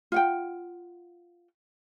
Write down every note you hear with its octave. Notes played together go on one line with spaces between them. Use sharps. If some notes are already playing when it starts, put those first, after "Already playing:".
F4 F#5 G5